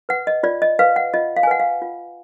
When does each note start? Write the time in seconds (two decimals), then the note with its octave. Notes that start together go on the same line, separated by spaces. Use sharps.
0.09 B4 F#5
0.27 D#5
0.43 F4 D5
0.62 D#5
0.79 B4 F5
0.96 F#5
1.14 F4 D#5
1.37 F5
1.43 G#5
1.47 B4 F#5
1.60 F5
1.82 F4